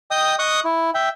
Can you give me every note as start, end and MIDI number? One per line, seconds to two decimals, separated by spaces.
0.11 0.35 75
0.11 0.35 79
0.11 0.35 87
0.39 0.60 75
0.39 0.60 85
0.39 0.60 87
0.39 0.60 90
0.64 0.90 64
0.94 1.09 76
0.94 1.09 79